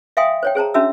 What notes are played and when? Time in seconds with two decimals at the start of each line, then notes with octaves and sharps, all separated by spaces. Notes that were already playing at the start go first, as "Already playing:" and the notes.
0.17 E5 F5 G5 G#5 C6 D#6
0.43 C5 C#5 G5
0.55 G#4 C5 A5 A#5
0.74 C#4 D4 F#4 E5 A5 E6